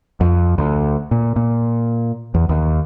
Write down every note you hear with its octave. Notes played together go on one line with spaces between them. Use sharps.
F2
D2
A#2
A#2
E2
D#2